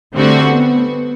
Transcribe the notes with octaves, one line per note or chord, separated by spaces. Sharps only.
D3 G3 A3 C4 F#4
B3